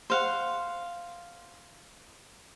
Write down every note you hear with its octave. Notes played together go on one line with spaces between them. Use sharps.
C5 F5 F#5